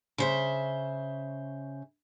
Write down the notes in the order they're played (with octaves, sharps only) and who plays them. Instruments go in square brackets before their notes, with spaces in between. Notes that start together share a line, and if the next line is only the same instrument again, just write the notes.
[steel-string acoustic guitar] C#3 C5 E5